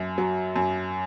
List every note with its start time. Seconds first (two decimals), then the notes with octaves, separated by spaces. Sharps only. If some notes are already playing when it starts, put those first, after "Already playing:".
Already playing: F#2
0.18 F#3
0.56 F#2